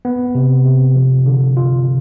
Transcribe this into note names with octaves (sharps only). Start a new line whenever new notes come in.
B3
C3
C3
F3
D3
F4